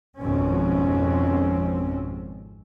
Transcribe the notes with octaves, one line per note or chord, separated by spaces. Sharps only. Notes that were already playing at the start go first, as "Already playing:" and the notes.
G#1 F2 G#2 B2 C4 C#4